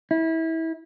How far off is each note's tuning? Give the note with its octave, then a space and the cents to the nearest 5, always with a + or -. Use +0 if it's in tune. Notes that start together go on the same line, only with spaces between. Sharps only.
E4 -25